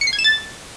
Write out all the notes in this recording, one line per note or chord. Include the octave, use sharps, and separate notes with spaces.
C#7
C7
G#6
E7
A6